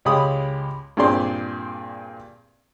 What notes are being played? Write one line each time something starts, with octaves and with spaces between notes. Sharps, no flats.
C#2 G#3 G4 F5 B5 D#6
G2 A#2 C4 G#4 D5 C6